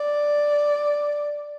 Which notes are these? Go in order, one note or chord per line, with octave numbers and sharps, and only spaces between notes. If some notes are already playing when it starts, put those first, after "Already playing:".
Already playing: D5